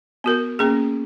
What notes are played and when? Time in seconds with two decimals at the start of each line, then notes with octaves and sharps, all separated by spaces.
0.24 B3 F#4 A#4
0.59 A#3 C#4 G#4